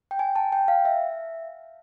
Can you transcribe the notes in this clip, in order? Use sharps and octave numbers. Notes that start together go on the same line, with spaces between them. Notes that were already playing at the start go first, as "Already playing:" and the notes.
G5
G#5
A5
G5
F5
E5